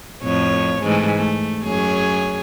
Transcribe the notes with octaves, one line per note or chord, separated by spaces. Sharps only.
F2 A2 C#5
G#2 E3 A3
A3
F#2 G#4 C#5